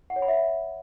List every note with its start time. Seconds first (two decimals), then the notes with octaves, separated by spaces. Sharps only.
0.10 F#5
0.16 C#5
0.22 B5
0.28 E5